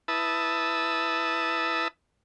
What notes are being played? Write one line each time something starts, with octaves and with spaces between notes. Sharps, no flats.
E4 B4 A5 D#6 E6